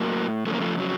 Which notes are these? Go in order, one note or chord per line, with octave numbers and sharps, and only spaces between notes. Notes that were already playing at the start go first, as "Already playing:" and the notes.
Already playing: A2 F#3 A#3
F2 C#3 A3
A#3
F3 A3
F#3